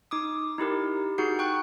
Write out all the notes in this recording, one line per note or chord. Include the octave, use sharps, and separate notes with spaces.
D#4 D6 D#6
D#4 E4 G4 A#4
D#4 F#4 G#4 F#5 G6 C7
G5 C#6 F#6